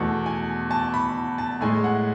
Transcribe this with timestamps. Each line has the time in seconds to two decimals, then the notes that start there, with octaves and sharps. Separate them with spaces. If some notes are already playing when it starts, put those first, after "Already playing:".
Already playing: E2 B2 A3 F#5
0.26 G#5
0.71 A5
0.94 B5
1.38 A5
1.61 A2 G#3 G#5
1.84 F#5